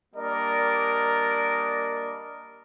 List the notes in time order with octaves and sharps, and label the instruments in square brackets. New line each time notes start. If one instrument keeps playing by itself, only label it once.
[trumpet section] G3 A#3 D4 A#4 D5 D#5